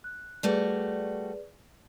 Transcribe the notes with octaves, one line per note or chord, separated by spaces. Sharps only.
F#6
G3 A3 F#4 G#4 B4 D5